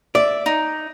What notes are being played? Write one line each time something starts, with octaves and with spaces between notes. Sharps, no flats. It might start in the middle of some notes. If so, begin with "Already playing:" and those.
D5 E5
D#4